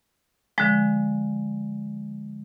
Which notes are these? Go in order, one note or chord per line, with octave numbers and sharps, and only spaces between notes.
D3 F3 G#3